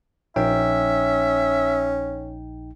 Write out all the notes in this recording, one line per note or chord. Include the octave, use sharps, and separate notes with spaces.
A#1 C#4 D#4 E5 G5